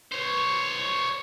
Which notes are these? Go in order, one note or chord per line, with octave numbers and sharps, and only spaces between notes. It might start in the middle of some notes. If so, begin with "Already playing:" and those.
C5 C#5